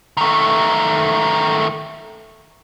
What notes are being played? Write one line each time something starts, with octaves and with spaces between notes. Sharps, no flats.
D#3 A3